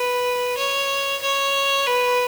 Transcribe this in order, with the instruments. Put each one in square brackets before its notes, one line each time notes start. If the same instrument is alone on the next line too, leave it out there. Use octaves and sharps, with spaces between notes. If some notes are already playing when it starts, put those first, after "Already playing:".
Already playing: [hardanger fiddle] B4
C#5
C#5
B4